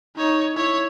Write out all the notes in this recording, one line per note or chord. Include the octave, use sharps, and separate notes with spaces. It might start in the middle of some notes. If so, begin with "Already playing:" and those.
D#4 C#5
E4 C#5